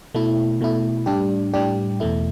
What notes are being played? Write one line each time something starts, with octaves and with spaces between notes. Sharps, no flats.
B2 A3 E4
B2 A3 E4
A2 G3 D4 G4
A2 G3 D4 G4
E2 B2 A3 E4